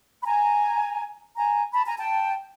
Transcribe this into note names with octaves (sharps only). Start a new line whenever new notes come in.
B5
G#5 A#5
G#5 A#5
A5 B5
G#5 A#5
G5 A5